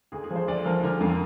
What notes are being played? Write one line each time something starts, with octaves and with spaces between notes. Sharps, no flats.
D2 G#4
G#4
F3
C5
D2 D5
F3 A#4
D3 A#4
F2